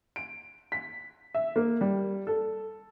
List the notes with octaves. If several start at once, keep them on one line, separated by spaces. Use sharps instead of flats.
D7
B6
E5
A#3
G3
A4